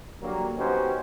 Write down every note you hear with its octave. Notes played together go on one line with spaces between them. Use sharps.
D3 F#3 G3 A#3
B3 C#4 D#4 F#4 G4 C5